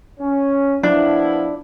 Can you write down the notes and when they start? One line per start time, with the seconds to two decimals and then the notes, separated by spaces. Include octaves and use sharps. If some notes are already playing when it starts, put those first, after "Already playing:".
0.19 C#4
0.83 F3 B3 D4 E4